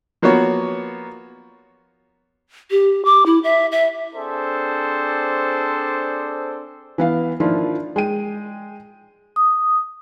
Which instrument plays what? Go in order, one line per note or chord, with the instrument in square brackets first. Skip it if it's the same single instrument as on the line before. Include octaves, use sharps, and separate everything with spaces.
[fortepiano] F3 A#3 B3 F#4 C#5
[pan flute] G4
D6
E4
E5
E5
[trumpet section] C4 D4 G#4 A4 C5 D5
[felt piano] E3 B3 F5
D#3 F3 A#3 D4 E4 F4
G#3 G5 D#7
[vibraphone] D#6